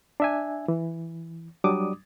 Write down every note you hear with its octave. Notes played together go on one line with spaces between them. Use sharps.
D4 E5 G#5
E3
F#3 G3 D4 D6 D#6